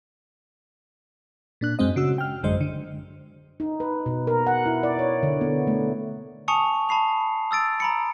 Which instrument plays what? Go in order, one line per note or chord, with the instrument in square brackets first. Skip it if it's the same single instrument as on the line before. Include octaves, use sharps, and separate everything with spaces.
[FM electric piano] A#2 D4 F#6
F#2 G#3 C4 D#5
C#3 F#4 E6
G5 F6
A1 F#2 D3 G#3 C5 D#5
D3
[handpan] D#4
B4
B2
A#4
F#5
E4
D5
C#5
D3
B3
A3
[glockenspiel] G#5 A5 C#6 D#6 C#7 F7
A5 B5 C7 F7
D#6 E6 A6 D7
A#5 B5 C#7